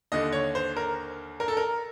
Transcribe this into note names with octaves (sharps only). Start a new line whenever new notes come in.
D#2 D3 D#5
C#5
C5
A#4
A#4
A4
A#4